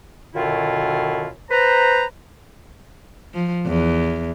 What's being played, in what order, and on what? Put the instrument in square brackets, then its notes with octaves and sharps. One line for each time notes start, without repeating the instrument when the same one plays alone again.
[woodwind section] F#2 B2 D3 D#3 E4 F4
B4 C5 A#5
[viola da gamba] F3
E2